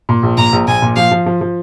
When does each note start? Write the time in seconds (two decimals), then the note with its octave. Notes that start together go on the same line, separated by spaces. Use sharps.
0.09 A#2
0.23 A#1
0.38 A#2 A#5
0.52 A#1
0.67 A#1 G#5
0.82 A#2
0.96 F3 F5
1.12 F3
1.26 F3
1.41 F3